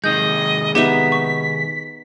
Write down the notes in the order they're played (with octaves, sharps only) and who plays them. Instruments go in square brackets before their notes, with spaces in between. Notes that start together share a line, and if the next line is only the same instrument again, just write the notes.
[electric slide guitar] C3 D#3 G#3 [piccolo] D#5 [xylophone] G6
[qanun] B3 D#4 E5 [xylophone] G4 [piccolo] B6
[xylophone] C#6